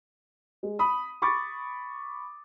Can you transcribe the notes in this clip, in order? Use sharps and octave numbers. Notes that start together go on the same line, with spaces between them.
G#3
B5 D#6
B5 C#6 D6 A6